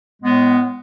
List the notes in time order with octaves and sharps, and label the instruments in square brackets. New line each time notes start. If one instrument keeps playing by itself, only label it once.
[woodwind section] A2 G#3 B3